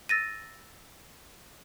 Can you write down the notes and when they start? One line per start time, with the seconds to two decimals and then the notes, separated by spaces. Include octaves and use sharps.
0.09 E6 A6 A#6 D#7